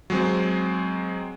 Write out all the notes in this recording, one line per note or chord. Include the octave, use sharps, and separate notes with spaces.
F#3 G#3 C4